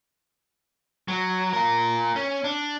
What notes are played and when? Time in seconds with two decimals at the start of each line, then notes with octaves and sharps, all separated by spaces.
1.08 F#3
1.53 F4 A#4
2.16 C#4
2.44 D4